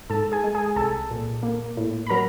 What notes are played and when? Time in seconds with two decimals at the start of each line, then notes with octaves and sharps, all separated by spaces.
0.10 G#2 A4 A5
0.32 G#4 G#5
0.44 G#3
0.55 G#4 G#5
0.76 C2 A4 A5
1.11 A#2
1.43 A#3
1.77 A2
2.07 B5
2.10 F#3 A#4 A#5